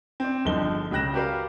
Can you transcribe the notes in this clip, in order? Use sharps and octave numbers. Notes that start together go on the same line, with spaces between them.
C4 D5
G1 D3 F3 G#3 D#4 G7
C#2 C#3 G5 F#6 A#6 E7
F#4 G4 A#4 B4 D5 F5